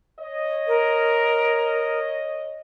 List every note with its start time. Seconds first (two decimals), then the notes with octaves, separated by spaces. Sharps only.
0.20 C#5 D#5
0.67 A#4